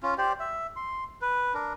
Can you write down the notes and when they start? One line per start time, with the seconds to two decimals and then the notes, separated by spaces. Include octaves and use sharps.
0.03 C#4 F4
0.18 G4 C5 D5
0.40 E5
0.76 C6
1.22 B4
1.54 D4 A#4